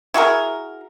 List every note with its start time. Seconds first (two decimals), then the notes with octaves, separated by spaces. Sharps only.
0.14 E4 F#4 G#4 A#4